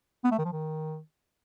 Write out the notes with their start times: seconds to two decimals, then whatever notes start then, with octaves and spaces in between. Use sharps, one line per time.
0.24 B3
0.31 A3
0.38 D#3
0.45 F3
0.52 D#3